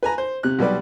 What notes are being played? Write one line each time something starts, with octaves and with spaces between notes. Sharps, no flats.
B4 G#5 A#5
C5
C3 F#6
B1 G3 G4 B4 D5